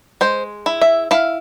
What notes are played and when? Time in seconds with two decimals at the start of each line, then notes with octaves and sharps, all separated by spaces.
0.21 G#3 C5
0.66 E4
0.81 E5
1.11 E4 F5